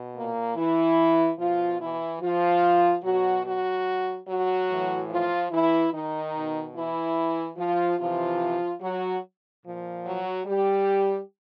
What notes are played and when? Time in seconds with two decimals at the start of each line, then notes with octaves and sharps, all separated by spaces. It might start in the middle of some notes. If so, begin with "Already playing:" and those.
Already playing: B2
0.15 A#2 A#3
0.56 E3 E4
1.39 B2 F3 F4
1.80 E3 E4
2.21 F3 F4
3.04 B2 F#3 F#4
3.45 F#3 F#4
4.27 F#3 F#4
4.68 A2 E3
5.10 F3 F4
5.51 E3 E4
5.92 D#3 D#4
6.34 B2
6.75 E3 E4
7.57 F3 F4
7.99 C3 E3 F3 F4
8.81 F#3 F#4
9.64 A#2 F3
10.05 F#3 F#4
10.46 G3 G4